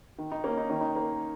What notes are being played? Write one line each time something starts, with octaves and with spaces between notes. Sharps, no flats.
D#3
D#4
A#3 C#4
D#4
D#3 C#4
D#4
A#3